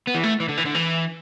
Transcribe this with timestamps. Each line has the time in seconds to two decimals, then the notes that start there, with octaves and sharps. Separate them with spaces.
0.07 B3
0.15 E3
0.24 A3
0.40 E3
0.49 D3
0.57 E3
0.65 D3
0.75 E3